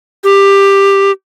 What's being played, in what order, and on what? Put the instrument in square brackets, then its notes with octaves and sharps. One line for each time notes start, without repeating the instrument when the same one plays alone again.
[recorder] G4